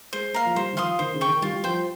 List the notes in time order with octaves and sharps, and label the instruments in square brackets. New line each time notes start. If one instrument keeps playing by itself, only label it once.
[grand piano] G#3 [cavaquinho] C5
[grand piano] A#3 [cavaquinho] F5 A#5
[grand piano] F3
[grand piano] G3 [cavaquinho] C5
[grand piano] D#3
[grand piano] F3 [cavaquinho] F5 C6 D#6
[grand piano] D#3 [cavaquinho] C5
[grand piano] C#3
[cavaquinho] G5 C#6
[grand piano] D#3
[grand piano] G3 [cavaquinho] F4
[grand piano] G3
[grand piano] F3 [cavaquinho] C5 G5